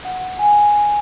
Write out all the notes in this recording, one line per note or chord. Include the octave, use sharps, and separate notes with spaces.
F#5
G#5